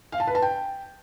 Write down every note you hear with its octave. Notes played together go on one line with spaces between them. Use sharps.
F5
A5
B4
A5
G5